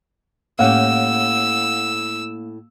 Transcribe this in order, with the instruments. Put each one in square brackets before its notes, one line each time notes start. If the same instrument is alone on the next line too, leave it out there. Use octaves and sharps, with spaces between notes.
[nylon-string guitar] A2 C#4 G4 [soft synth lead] A#3 [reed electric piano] F5 F#5 [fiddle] E6